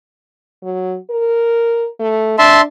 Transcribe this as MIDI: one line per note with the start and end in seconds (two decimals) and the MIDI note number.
0.63 0.96 54
1.11 1.89 70
1.99 2.35 57
2.39 2.65 62
2.39 2.61 76
2.39 2.61 81
2.39 2.61 84